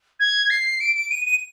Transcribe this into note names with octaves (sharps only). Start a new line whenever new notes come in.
G#6
C7
D7
D7
D#7
D#7